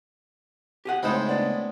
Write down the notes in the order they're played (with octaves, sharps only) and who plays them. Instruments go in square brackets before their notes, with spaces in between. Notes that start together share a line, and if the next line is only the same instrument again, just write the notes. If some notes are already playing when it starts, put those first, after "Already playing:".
[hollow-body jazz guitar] G4 G#4 F#5
[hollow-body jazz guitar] C#2 D#4 C5 [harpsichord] A2 G#3 C4 [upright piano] B5
[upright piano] B3 D4